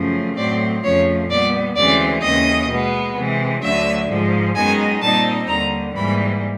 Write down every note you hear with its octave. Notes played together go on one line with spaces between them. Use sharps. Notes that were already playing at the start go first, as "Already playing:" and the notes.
Already playing: F#2 C#3 F3 A3
A2 F#3 A3 C4 D5
F2 C#3 F3 A3 C#5
A#2 G3 B3 D5
D2 C#3 E3 G#3 C4 D5
D#2 C#3 E3 D#5
B2 G#3 B3
C3 E3 G#3
D2 D3 F#3 A3 E5
G#2 F3 G#3
F#2 D#3 G#3 B3 D#4 G#5
A#2 G3 C4 D#4 A5
D#2 D3 G3 A#5
G#2 E3 G3 A#3 B5